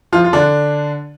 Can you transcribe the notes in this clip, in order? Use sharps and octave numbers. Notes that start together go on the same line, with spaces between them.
F3 F4
F4
D3 D4